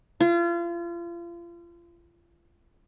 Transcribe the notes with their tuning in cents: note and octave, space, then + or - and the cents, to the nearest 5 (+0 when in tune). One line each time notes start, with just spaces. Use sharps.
F4 -35